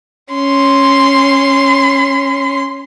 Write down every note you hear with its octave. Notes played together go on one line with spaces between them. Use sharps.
C#4 C6